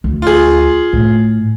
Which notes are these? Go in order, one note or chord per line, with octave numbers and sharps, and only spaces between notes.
D2
F4 G#4
A2